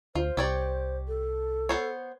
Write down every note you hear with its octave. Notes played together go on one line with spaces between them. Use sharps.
D2 F4 C5
C2 G4 C#5 D5
A4
B3 C5 C#5